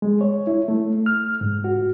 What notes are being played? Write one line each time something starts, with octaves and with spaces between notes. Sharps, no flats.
G#3
C#5
E4
A3
F6
G#2
F#4